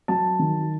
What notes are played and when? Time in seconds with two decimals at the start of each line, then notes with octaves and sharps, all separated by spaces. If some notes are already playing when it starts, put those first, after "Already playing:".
0.08 F#3 A5
0.39 D#3